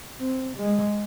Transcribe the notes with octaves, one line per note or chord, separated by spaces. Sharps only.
C4
G#3